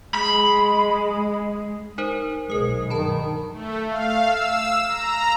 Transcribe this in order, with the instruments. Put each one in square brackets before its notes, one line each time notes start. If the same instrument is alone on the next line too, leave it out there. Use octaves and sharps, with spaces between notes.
[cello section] G#3 [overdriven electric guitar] B5
[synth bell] D#4 A#4 C5
[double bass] B1 G#3 [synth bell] A#4 D#6
[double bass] G2 D#3 [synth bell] A5 B5
[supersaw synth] A3
F5
E6
A#5